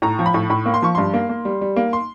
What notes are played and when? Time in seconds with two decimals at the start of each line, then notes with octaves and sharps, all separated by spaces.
0.02 A2 A#5
0.19 F3
0.26 B5
0.34 A2
0.50 A2 B5
0.66 A#3
0.74 C6
0.82 F3 C#6
0.95 G2 C6
1.14 A#3
1.29 A#3
1.45 G3
1.61 G3
1.76 A#3
1.93 C6